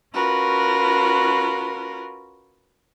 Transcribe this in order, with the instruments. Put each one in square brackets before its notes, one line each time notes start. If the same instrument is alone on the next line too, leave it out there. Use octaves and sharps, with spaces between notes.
[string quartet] C#4 F4 F#4 A#4 B4